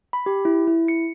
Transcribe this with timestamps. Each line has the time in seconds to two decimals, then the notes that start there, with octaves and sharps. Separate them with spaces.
0.13 B5
0.26 G4
0.45 E4
0.67 E4
0.88 C#7